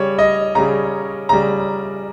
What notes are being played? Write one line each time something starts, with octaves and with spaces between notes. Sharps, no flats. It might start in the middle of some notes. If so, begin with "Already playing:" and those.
Already playing: C#3 G3 C#5
D#5
C#3 G3 A#5
C#3 G3 A#5